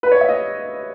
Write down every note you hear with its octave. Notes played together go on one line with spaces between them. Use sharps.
B4
C#5
E5
D#5